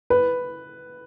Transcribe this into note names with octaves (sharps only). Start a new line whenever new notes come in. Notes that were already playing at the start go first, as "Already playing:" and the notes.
B4